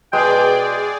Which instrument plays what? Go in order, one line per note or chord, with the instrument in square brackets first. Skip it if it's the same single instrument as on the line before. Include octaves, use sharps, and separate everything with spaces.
[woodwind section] B2 G5 [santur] G#3 [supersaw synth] G#4 D5